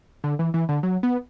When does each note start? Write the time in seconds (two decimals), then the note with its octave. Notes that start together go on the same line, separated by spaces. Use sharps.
0.24 D3
0.39 E3
0.54 E3
0.69 D3
0.83 F#3
1.03 B3